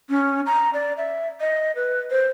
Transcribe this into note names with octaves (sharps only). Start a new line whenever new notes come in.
C#4
A#5
D5
E5
D#5
B4
C5